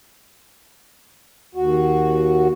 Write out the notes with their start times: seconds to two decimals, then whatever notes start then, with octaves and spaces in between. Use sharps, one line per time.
1.55 D#2 F#4